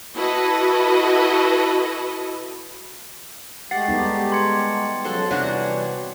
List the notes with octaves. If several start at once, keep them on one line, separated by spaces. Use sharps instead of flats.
E4 F#4 A4 B4 D#5
G#3 A3 G4 F#5 A6 C7
G3 B3 D#4
C6 G#6 C#7
C#3 F3 F#3 F#4 A4 C5
C3 E3 G3 D4 F#4 C#5 F#5